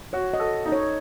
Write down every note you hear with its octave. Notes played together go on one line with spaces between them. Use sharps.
F#4 C#5
D#5
A4
D#4
C#5